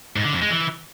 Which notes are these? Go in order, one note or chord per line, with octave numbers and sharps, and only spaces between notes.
G#2
D3
F2
G#3
E3